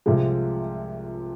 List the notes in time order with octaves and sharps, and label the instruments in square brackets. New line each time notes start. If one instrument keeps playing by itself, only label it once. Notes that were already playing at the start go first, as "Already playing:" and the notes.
[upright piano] C2 C3 F3 G#3